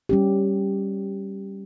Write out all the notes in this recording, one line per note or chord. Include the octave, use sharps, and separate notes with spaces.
G3 C#4 G4